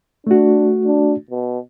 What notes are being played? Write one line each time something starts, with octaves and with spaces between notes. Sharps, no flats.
A3 D4 F#4
D4
B2